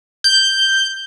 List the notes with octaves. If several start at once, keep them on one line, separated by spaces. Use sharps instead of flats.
G6